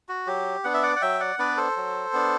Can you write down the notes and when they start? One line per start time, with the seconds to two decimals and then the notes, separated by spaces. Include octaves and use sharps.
0.09 F#4
0.27 F#3 G4
0.64 B3 D4 F#5
0.74 E5
0.83 D5 F#5
0.96 F#5
1.02 F#3 E5 G5
1.20 D5 F#5
1.39 B3 D4 B4 D5
1.57 A4 C5
1.76 F#3
2.13 B3 D4